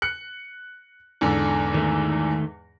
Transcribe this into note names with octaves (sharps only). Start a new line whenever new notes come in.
F#6 C#7
E2 G#2 D3
D#3 A3